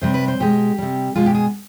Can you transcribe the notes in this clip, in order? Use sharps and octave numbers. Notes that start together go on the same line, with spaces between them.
C3 G3 C5
B4
C5
B2 G#3 G4
C3 G3
B2 G#3 F4
G4
G#4